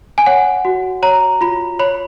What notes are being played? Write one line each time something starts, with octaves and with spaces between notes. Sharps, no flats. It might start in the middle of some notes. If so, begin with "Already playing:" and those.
G#5
C#5 F#5
F#4
C#5 A#5
F4 B5
C#5 B5